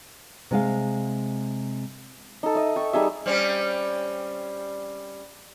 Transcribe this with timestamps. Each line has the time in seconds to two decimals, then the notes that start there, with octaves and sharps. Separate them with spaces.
0.51 C3 G#3 F5
2.43 D#4 A4
2.55 D#5 E5
2.76 A4 G5 C#6
2.93 G3 D#4 G#4 E5
3.26 G3 C4 C#4